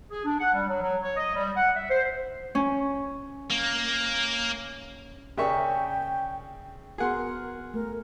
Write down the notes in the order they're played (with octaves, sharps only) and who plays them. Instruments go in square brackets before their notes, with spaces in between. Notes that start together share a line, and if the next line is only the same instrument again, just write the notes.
[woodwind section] G#4
D4
F#5
G3
F#3
F#3
C#5
D#5
G3
F#5
E5
C5
[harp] C#4
[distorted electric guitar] A#3
[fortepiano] C#3 E5 C#6 [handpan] C#4 A#4 D5 [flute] G5
[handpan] B3 F#4 [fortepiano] G#4 F#5 C6 [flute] A#4
[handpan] A3 [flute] A#4